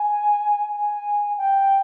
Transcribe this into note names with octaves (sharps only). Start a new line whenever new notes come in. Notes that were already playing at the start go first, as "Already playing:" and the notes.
Already playing: G#5
G#5
G5